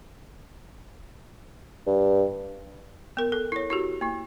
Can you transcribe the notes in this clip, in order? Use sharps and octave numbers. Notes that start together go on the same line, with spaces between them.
G2
B3 A#4
A4
E4 C#5
E4 F#4 G4
A#3 E4